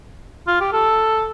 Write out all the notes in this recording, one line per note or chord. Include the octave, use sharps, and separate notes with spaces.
F4
G4
A4